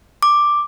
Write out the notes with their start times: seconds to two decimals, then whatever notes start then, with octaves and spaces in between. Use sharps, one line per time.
0.23 D6